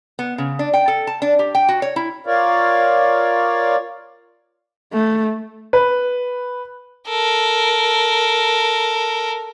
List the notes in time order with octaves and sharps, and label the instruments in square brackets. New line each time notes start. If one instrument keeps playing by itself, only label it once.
[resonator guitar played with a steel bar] B3
C#3
D4
G5
A4
A5
D4
G4
G5
F#4
C#5
E4
[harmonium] F4 A#4 C#5 D5 F5
[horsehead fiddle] A3
[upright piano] B4
[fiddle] A4 A#4